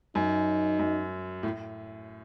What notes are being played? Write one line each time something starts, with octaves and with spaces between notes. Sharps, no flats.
F#2 D#4
F#2
A2